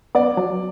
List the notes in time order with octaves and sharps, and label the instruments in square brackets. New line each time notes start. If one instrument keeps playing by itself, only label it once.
[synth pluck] B3 [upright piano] D5
[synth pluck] F#3